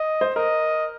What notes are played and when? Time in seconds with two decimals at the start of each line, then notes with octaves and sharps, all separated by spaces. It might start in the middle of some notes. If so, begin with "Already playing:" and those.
Already playing: D#5
0.21 C5
0.35 A#4 D#5